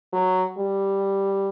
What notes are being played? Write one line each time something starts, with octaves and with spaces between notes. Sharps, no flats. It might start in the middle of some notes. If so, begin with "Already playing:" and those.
F#3
G3